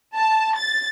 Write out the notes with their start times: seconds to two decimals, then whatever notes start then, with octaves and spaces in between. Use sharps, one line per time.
0.15 A5
0.57 A6